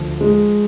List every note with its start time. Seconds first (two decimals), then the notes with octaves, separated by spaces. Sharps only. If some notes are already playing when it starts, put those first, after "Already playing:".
Already playing: D2 F3
0.21 G#3